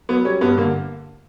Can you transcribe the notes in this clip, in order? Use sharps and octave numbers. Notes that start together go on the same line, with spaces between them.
F#3 B3
G3 C#4
G2 B3
D3 A#3